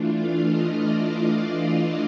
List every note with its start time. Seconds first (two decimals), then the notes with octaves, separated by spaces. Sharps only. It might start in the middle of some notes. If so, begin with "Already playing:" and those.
Already playing: E3 A3 D4 F4
0.15 F5
0.46 D#5
0.76 D5